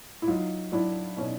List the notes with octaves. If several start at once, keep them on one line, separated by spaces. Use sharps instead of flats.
E4
F#3 D#4 F4
F#3 D4 E4
B2 C#4 D#4